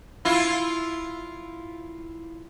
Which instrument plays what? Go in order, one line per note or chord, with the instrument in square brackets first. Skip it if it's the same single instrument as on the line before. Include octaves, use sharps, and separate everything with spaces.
[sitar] E4 F4